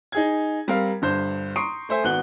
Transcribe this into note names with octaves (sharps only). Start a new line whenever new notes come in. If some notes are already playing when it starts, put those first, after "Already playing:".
D#4 G#4 G#6
G3 C4 A#4 F5
G1 G2 C5 G6
A#5 C6 C#6 D#6 C7 D7
A3 C5 E5 G#5
G#1 B3 F#4 F#6 G7